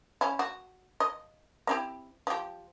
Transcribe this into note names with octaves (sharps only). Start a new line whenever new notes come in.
C#4 E4
F#4
D#5
C4 E4 G4
F3 G4